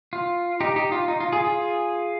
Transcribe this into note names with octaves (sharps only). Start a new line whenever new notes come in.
F4
D#4 G4
D#4 G4
F4
D#4
F4
F4 G#4
F4 G#4